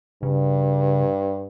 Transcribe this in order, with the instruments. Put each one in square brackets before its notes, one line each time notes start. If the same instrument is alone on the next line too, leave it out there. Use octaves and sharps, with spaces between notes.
[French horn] G2 [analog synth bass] C#3